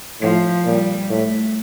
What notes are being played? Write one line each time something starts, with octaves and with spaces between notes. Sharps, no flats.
A2 F3
A#2 G3
A2 A3